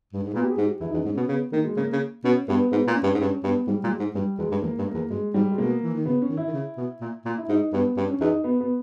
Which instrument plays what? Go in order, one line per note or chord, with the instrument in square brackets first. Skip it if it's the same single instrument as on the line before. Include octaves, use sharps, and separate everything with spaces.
[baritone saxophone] G2
G#2
[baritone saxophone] A#2 [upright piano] B3
[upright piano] G4
G#4
[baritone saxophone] G#2
[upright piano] G4
[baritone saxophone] E2 [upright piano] E4
[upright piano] D#4
[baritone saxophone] E2
[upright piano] C#4
[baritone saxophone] G#2
[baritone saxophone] B2 [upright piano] C#4
[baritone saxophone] C#3 [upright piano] B3
[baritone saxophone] D#3 [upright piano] A#3
[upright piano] G#3
[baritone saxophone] C#3 [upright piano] A#3
[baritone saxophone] C#3
[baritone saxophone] B2 [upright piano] C#4
[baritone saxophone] G2 [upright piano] B3
[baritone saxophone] G#2 [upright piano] B3
[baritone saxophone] A#2
[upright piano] C#4
[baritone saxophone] G2
G#2
[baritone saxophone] G2 [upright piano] C#4
[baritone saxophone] G2 [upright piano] B3
[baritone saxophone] G#2 [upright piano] G3
[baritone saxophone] A#2 [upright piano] G3
[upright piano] G#3
[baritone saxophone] G#2
[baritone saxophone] G2 [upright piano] G3
[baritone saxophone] E2 [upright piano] G#3
[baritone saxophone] G2
[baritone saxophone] E2 [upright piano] A#3
[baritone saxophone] G2
[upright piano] A#3
[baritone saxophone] E2
[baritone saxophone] G2 [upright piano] G#3
[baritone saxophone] G#2 [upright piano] G3
[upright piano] G#3
[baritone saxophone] B2 [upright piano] A#3
[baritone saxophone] E3
D#3
[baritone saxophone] C#3 [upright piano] B3
[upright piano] C#4
[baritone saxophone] D#3
[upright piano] E4
[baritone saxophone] D#3
C#3
B2
A#2
A#2
[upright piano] E4
[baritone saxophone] G#2 [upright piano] D#4
[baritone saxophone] G2 [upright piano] B3
[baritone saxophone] G2 [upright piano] C#4
[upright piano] C#4
[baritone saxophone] E2 [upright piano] D#4
[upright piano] B3
B3